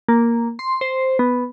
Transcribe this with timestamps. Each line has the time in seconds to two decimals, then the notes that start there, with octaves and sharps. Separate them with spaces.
0.08 A#3
0.59 C6
0.81 C5
1.19 B3